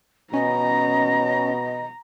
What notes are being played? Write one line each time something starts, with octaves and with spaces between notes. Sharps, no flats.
B2 C#4 D#5 A#5